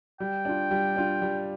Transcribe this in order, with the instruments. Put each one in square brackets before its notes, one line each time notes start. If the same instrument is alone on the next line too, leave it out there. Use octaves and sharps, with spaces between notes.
[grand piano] G3 [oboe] G5
[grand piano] D4 F4
G3
D4 F4
G3